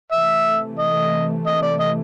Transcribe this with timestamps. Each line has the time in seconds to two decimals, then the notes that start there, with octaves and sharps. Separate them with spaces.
0.12 C3 E3 A3 E5
0.79 D#5
1.46 D#5
1.63 D5
1.80 D#5